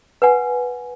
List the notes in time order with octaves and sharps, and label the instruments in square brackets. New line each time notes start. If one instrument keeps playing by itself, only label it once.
[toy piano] B4 F#5 G#5